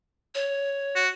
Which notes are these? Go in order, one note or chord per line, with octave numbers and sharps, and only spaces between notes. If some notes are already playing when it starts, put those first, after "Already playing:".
C#5
F#4